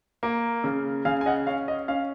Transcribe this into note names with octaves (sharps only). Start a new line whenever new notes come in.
A#3
C#3
C#3 F5 G#5
G#5
D#5 F#5
C#4 F5
D#5
C#4 F5